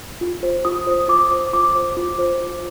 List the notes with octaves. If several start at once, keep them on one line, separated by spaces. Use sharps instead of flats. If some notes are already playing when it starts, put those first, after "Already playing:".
F4
C5
F4 D#6
C5
F4 D6
C5
F4 D6
C5
F4
C5
F4